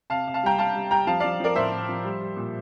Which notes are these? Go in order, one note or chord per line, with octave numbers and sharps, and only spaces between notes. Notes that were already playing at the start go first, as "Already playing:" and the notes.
C3 F5 A5
C3
F5 A5
G3 G5 A#5
G3 F5 A5
G3
G3 G5 A#5
F3 F5 A5
F3 D5 F5
F3 A#4 D5
A2 C5 E5
A2
F3
G3
G3
A#2